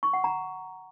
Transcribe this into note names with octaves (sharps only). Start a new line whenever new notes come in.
C#6
F#5
A#5